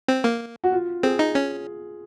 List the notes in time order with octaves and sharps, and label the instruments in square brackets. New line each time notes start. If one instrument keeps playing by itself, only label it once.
[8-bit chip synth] C4
A#3
[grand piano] F#4
F4
[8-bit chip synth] C4 [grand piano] G#4
[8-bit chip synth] D#4
C#4